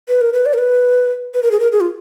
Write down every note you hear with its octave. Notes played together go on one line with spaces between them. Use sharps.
B4
A#4
B4
D5
A#4
B4
B4
A#4
G#4
A#4
G#4
F4